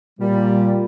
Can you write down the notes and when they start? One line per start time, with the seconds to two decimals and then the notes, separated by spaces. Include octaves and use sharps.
0.20 A#2 G3